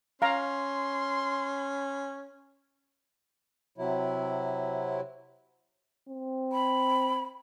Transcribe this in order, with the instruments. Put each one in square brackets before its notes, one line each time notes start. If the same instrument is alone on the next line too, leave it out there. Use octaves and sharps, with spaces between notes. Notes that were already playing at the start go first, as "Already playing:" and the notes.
[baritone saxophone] C#4 [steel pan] F5 A#5 [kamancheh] C6
[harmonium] C3 F#3 E4
[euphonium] C4
[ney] B5